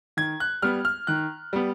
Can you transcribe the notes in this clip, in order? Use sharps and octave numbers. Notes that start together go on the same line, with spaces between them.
D#3 G#6
F#6
G3 B3 F6
F6
D#3 F#6
G3 B3